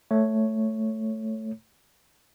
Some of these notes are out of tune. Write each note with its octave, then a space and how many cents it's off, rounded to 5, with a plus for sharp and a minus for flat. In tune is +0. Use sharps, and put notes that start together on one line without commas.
A3 +0 C#5 +0